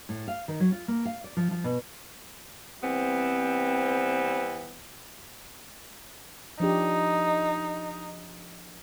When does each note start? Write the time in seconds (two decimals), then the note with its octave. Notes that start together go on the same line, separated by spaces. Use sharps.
0.09 A2
0.28 F5
0.48 D#3
0.60 F#3
0.72 F4
0.88 A#3
1.05 F5
1.24 D5
1.37 F3
1.51 F3
1.64 B2
2.82 E3 G3 B3 C4
6.60 F3 D4 D#4 G4